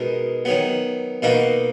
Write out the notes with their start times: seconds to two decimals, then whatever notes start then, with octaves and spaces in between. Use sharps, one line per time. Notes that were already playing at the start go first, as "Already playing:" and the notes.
Already playing: B2 G#3 D#4 A#4
0.45 D#3 F#3 B3
1.22 B2 A#3 D#4 F#4